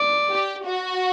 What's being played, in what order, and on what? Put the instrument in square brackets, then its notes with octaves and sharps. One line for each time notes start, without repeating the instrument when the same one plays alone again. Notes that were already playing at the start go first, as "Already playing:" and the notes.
Already playing: [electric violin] D5
[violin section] G4
F#4